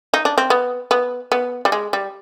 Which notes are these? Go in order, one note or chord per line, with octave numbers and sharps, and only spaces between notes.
D#4
D4
C4
B3
B3
B3
G3
G#3
G3